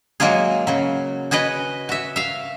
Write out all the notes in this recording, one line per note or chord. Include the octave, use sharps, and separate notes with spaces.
F#3 G#3 A#3 F4 G#4
C#3 F#3
F#4 G#4 B4 D#5 F#5
F#4 E5
E5 F5